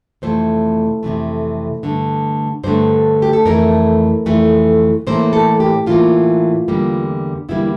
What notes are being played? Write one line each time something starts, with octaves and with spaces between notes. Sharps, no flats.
F2 C3 E3 A3 C5
F2 C3 E3 A3
G2 D3 A3
G2 D3 A3 C5
G4
A4
F2 E3 A3 A#4
F2 E3 A3
A2 E3 A#3 C5
A4
G4
A2 E3 A#3 F4
E2 D3 G3 A#3
E2 D3 G3 A#3 E4